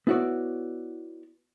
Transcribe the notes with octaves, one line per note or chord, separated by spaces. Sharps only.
B3 E4 F#4 C#5 D5